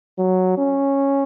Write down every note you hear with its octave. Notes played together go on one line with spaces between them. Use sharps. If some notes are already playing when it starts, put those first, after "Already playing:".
F#3
C#4